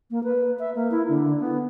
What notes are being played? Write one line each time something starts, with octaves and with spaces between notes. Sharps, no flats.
A#3
B4
E5
A#3
E4
D3
B3